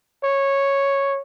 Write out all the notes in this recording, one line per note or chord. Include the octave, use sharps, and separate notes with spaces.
C#5